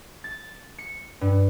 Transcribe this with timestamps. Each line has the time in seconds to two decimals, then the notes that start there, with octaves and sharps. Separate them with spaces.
0.24 A6
0.79 C#7
1.21 G2